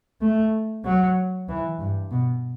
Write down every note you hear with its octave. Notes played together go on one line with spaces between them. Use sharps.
A3
F#3
E3
G2
B2